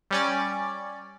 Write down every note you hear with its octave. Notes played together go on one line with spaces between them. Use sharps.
G3 C#4 D5